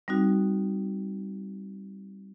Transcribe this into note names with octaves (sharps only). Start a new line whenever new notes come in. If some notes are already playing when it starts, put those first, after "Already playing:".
G3 C4 D#4 F#4